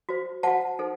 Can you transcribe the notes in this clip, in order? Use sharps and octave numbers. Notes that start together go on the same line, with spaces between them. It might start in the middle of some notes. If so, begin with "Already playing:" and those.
F#4 C5
F#4 C5 F#5 A5
D#4 A4 C5